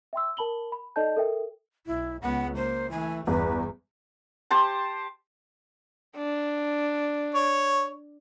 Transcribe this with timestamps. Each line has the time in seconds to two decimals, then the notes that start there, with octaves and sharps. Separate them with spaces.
0.13 E5 G5 C6 E6
0.37 A#4 A5 B5 F#7 G7
0.72 B5
0.96 D#4 A4 D5 D#5 A5 G6
1.16 A4 A#4 E5 G5
1.87 B1 E4
2.22 C#2 B3 F#5
2.56 A#3 C5
2.91 E3 A3 G#5
3.27 G1 E2 G3 B4
4.51 G4 C5 A5
6.16 D4
7.35 C#5